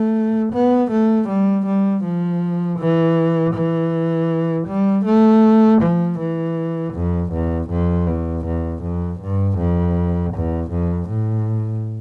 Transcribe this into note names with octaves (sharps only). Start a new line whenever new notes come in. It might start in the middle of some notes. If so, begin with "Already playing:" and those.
Already playing: A3
B3
A3
G3
G3
F3
E3
E3
G3
A3
F3
E3
F2
E2
F2
E2
E2
F2
G2
F2
E2
F2
A2